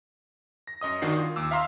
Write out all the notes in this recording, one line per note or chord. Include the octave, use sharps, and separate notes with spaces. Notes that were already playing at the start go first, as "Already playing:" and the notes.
A#6
F#2 D#5 D#6
G1 D#3 D4 F#4 C7
F4
D#2 D6 E6
E5 F5 A#5 C6 F6